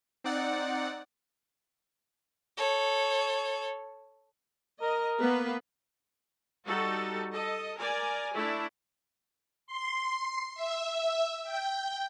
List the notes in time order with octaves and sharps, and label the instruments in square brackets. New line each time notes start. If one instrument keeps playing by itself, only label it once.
[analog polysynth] C4 D#4 D5 F#5
[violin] A4 C#5
[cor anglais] A#4 [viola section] D#5
[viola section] A#3 B3 B4
G3 D#4 F#4 A4
A4 D#5
A#4 D5 G#5
A3 D4 E4
[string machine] C6
E5
G5